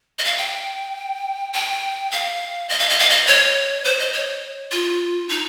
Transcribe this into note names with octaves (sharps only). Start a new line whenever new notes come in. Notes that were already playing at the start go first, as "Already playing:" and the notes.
D#5
F5
G5
G5
F5
D#5
F5
D#5
F5
D#5
C#5
C5
D#5
C#5
F4
D#4